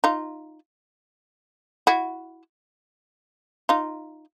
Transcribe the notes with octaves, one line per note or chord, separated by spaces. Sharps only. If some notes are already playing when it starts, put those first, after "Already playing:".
D#4 F4
E4 F#4
D#4 F4